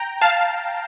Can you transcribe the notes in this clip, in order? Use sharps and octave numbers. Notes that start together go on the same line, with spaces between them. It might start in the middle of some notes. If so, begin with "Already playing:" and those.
Already playing: G5 A#5
F5 A5